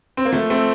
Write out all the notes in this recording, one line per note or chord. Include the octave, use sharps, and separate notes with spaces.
C4
A#3
F3 A3
A3 C4